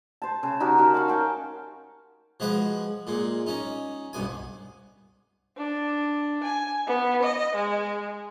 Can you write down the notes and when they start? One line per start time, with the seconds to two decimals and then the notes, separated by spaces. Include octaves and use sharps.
0.22 C5 A5
0.43 C#3
0.60 D#4 F#4 G4 A#4
0.78 F#4 A#4 A5
0.94 F5 C6 C#6
1.08 C#4 G5 A5
2.40 F3 G#3 F#4 B4
3.07 A#2 G#3
3.47 C#4 D#4
4.13 C2 G2 B2 G#5
5.57 D4
6.44 G#5
6.87 B3
7.23 D#5
7.55 G#3